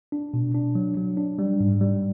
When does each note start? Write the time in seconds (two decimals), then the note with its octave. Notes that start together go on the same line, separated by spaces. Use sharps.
0.12 D4
0.34 B2
0.55 D4
0.75 F#3
0.97 F#3
1.17 D4
1.39 G3
1.60 G#2
1.81 G3